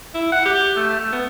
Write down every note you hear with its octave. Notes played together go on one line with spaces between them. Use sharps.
E4
F#5
G4
A3
A3
B3